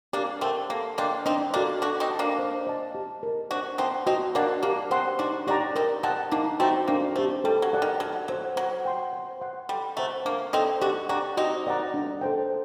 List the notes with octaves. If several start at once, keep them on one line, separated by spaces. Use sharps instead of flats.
A#3 D4 G4
A3 C4 A#4 F#5 A5
A#3 A4
A#3 D4 D#5 G5 C6
C4 D4 D#4
A#3 D4 F#4 A4
D4 F#4 A4
C4 D#4
D5 A5
A#3 D4
C5
D#5 A5
G4
A#4 D#5
D4 F#4 C5
C4 D#4 F#5 A5 C6
C4 D#4 F#4
A#3 D4 A#4 D5 F#5 A5
A#3 D4 G4
C4 D#4 C5 F#5 C6
D4 D#4 F#4
D4 F#4 G4 D5 G5 A#5
C4 D#4 A#4
C4 D#4 F#5 A5
A#3 D4 D#4
A3 C4 F#4 C5 G5 A#5
A#3 D4
A3 G4 C5
G3 A4
F#3
D5 F#5 A5
D#3
F#3 A4
F#3 C5 F#5
F#3 C5
G5 C6
C5
F#5 C6
G3 A4
A3 C5 F#5 A#5
A#3 D4
C4 D#4 A4 D5 G5
D4 F#4 G4
D4 F#4 D5 G5 A#5
C4 D#4 F#4
A#4 D5 F#5 A#5
D4
A4 C5 G5